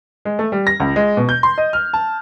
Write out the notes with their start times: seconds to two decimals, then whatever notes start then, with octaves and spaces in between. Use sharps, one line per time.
0.25 G#3
0.39 A3
0.52 G3
0.67 A#6
0.80 C#2
0.96 G#3
1.17 B2
1.29 G6
1.43 C6
1.58 D#5
1.73 F6
1.93 A5